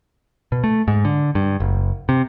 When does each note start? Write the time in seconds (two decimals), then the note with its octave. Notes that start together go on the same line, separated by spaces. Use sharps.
0.52 B2
0.64 A3
0.88 G#2
1.05 D3
1.35 G2
1.60 F#1
2.09 C3